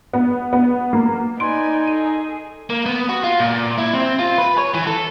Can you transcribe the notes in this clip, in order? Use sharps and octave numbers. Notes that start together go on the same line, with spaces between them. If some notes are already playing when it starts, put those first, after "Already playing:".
B3
B3
A#3
D#4 B4 D5 G#5 C6 D7
G#4 A4 D#7
A#3
B3
F#4
F4
A#2
E4
C4
F4
B4
C#5
E3
A4